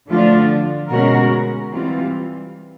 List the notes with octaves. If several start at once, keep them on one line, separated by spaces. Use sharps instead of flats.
D3 F3 A3 D4 F4
B2 G#3 C#4 F#4 A#4
E3 G3 C4 F4